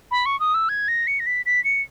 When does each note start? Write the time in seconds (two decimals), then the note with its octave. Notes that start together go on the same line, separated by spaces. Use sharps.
0.11 B5
0.26 C#6
0.40 D#6
0.54 E6
0.69 G#6
0.88 A#6
1.07 C#7
1.20 A#6
1.26 B6
1.46 B6
1.64 C#7